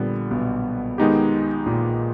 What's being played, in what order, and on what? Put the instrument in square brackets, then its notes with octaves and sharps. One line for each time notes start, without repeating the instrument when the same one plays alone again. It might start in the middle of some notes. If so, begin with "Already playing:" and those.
Already playing: [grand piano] A#1 A#2 [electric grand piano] D3 G3 B3
[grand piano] B1 B2
[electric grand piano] D#3 G#3 B3 D#4 G4
[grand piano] A#1 A#2